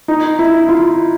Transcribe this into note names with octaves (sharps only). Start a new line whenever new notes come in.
D#4
E4
F4